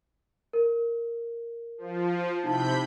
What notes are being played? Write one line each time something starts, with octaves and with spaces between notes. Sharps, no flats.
A#4
F3
C3 D#4 E4 A5 B5 G6